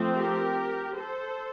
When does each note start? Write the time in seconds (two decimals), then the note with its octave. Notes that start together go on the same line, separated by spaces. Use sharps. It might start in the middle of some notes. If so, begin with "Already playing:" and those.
Already playing: F3 A3 C4
0.16 G4 A#4
0.96 A4 C5